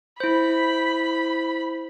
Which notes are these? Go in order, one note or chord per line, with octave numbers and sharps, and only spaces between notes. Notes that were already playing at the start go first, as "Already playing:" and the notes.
E4 C5 B5